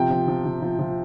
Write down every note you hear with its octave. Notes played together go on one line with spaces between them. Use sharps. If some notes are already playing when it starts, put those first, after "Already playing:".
Already playing: C3 F3 G5
F3
F3
F3
F3
F3